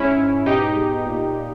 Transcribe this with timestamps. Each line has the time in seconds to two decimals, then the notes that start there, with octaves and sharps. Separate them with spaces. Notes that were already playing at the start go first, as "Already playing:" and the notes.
Already playing: G#2 C#4 E4
0.17 G#2
0.46 B2 D#4 G4
0.76 G#3
1.05 A#2
1.35 A#2